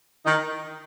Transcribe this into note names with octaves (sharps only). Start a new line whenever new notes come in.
D#3 D#4